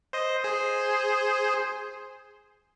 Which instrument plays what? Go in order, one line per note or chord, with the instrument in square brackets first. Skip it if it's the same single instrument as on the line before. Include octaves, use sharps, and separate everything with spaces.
[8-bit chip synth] C5 D#5
G#4 C5